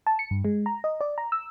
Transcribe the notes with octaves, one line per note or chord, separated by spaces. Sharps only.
A5
C#7
G2
G#3
A#5
D#5
D5
A#5
E6